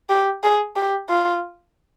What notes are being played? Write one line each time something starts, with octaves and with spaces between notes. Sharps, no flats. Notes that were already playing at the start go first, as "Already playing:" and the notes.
G4
G#4
G4
F4